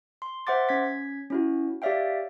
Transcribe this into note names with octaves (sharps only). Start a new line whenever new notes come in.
C6
C5 E5 F#5 C6 D6 A6
C#4 G#6 B6
C#4 E4 F#4
G4 C#5 D5 E5 F5 G5